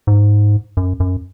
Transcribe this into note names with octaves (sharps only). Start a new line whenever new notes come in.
G#2
F#2
F#2